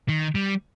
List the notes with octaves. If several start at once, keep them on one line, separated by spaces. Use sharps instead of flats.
D#3
G3